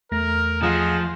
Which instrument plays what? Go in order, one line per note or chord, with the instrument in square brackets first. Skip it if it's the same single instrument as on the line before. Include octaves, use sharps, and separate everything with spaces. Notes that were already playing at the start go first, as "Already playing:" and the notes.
[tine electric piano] E2 A3 A#6 [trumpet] A#4
[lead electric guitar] F3 [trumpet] F4 [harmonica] G#4 D#5 F#5